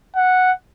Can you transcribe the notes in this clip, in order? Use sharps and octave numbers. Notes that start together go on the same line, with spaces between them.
F#5